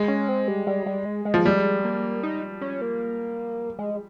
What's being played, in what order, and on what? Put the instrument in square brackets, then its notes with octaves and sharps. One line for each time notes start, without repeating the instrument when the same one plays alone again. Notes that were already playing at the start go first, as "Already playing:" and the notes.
Already playing: [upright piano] G#3
[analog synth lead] C#4
C4
G3
G3
G3
G#3
G#3
[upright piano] F3
[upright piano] G3 [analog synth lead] G#3
[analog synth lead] A#3
D#4
C#4
A#3
G#3